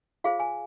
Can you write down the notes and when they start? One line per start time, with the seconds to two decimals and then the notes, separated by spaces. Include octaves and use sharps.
0.24 F4 G#4 C5 F5
0.40 G#5